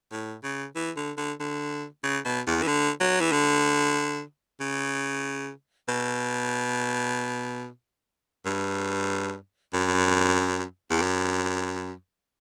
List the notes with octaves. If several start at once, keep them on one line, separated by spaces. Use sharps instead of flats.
A2
C#3
E3
D3
D3
D3
C#3
B2
E2
E3
D3
F#3
E3
D3
C#3
B2
G2
F#2
E2
F#2